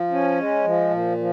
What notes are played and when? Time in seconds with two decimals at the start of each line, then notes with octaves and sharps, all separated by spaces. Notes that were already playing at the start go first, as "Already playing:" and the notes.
Already playing: F3
0.11 C#4
0.38 G#3
0.64 F3
0.90 A#2
1.17 F3